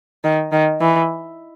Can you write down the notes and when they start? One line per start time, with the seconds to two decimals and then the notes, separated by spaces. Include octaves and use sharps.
0.24 D#3
0.52 D#3
0.81 E3